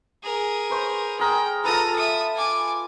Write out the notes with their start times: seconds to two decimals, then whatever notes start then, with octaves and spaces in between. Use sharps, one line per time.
0.24 G#4 A#4
0.70 B4 C5 C#6
1.19 G#4 A#4 G5
1.64 F4 A4 B4 A#5 D#6
1.96 E5 D#6
2.36 G#5 D6